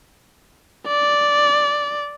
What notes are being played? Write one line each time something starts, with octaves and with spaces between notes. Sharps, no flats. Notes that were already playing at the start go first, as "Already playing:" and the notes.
D5